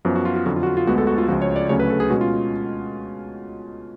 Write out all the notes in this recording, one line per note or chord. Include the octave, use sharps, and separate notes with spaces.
F#2 F3 B3 F#4
F#4
F4
F4
F2 D3 F#3 F#4
F4
F#4
F4
F4
D2 D3 G#3 B3 F#4
A4
F#4
F4
C#2 C#3 F3 F#4
C#5
D5
D2 C#3 F#3 A3 C#4 C#5
B4
A4
G#4
B2 G#3 C#4 F#4
F4